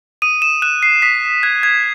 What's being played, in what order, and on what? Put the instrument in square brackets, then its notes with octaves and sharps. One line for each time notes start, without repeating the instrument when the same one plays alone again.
[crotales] D#6 D#7
E7
F#6 E7
C7
D#6 B6
F#6 G#6
G#6